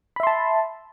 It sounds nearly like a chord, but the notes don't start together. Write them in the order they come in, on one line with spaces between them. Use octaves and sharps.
B5 E5 C6 A5